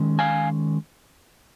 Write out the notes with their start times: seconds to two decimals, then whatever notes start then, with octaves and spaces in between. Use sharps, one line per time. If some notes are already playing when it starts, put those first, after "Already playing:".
Already playing: D#3 G#3 C#4
0.19 F5 G#5